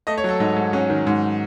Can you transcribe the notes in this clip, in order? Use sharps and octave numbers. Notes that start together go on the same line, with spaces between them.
A3 D#5
C#5
F#3 A4
G#2 D#4
G#2
F#3 C#4
D#3
G#2